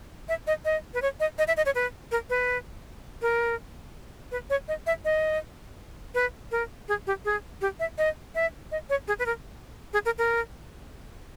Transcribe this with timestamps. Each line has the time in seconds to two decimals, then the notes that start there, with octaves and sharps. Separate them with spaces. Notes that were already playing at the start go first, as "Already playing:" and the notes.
0.29 E5
0.47 D#5
0.65 D#5
0.94 B4
1.02 C#5
1.20 D#5
1.38 D#5
1.48 E5
1.57 D#5
1.66 C#5
1.75 B4
2.11 A#4
2.30 B4
3.22 A#4
4.31 B4
4.50 C#5
4.68 D#5
4.87 E5
5.05 D#5
6.15 B4
6.51 A#4
6.88 G#4
7.07 G4
7.25 G#4
7.61 G4
7.80 E5
7.98 D#5
8.35 E5
8.72 D#5
8.90 C#5
9.08 G#4
9.19 B4
9.26 A#4
9.93 G#4
10.05 A#4
10.18 A#4